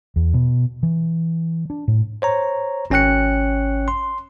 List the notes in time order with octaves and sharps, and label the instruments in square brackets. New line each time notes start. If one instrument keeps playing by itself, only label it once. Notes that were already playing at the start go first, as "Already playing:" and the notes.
[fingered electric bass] E2
B2
E3
D4
A2
[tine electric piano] C5 C#5 A#5
G#1 C#4 C#5 G5 F#6 C#7
C6